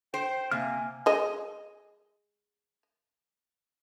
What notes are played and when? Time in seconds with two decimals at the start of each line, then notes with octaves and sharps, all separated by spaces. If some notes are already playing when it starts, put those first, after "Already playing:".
0.14 C5 G5
0.51 C3 A#3 G#5 F6
1.06 G#3 D#5